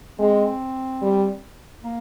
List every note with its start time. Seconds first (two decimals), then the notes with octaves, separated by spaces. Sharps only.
0.19 G#3 C4
1.02 G3
1.84 A#3